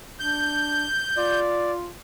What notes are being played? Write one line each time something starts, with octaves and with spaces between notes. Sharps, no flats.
D4 G6
F4 D5